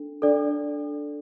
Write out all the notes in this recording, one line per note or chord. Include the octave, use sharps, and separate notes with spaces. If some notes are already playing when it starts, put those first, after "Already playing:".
Already playing: D4 A4
D4 A4 D5